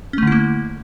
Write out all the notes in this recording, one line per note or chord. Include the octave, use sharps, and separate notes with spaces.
D3 A3 A#3 C#4 E4